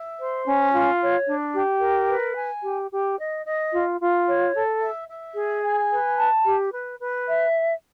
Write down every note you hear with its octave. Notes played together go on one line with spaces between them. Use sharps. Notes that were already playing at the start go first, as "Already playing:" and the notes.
Already playing: E5
C5
C#4
F4
C#5
D4
G4
A#4
B4
G#5
G4
G4
D#5
D#5
F4
F4
C#5
A4
E5
E5
G#4
G#5
B4
A5
G4
B4
B4
E5